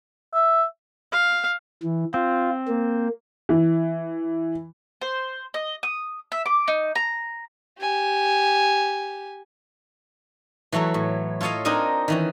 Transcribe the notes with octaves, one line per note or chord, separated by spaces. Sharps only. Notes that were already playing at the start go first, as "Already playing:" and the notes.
E5
F5
E3
C4 F4
A#3
E3
C5
D#5
D#6
E5
D6
D#4
A#5
G4 G#5
E3 F#3 A3 A4 C#5
A2
F4 A4 C#5 D#5 F5
C4 D4 D#4 A#4 D#5 G#5
D#3 E3 C#4